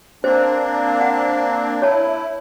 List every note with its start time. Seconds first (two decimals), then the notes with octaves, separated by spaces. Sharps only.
0.24 A#3 C4 D4 C5
1.01 F#5
1.82 E4 C#5 A5